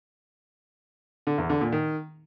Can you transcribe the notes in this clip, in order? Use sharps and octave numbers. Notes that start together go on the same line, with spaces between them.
D3
E2
D3
A#2
D#3